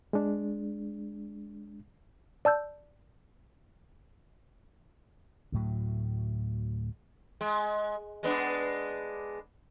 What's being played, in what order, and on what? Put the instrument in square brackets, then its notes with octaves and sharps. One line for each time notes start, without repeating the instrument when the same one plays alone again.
[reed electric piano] G#3 D4
[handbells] D5 A5 E6 G6
[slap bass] D2 A2 F#3
[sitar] G#3
G#3 B3 D4